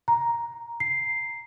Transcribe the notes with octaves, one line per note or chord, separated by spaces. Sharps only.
A#5
C7